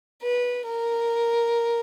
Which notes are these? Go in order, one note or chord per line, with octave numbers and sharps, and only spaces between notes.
B4
A#4